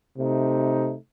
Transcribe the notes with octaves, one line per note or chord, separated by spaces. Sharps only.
C3 A3 D#4